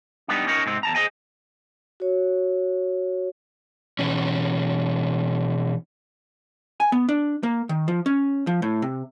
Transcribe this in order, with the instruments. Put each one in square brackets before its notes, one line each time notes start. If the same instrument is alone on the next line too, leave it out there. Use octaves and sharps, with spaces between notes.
[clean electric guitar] G3 B3 D4 D#4
C#4 D#4 A#4 C#5
G#2 C3 C4
E2 A5 A#5
G#4 C5 D#5 G#5
[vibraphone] F#4 C#5
[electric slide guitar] B2 E3 C#4
[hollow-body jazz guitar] G#5
B3
D4
A#3
D#3
F3
C#4
F3
A2
C3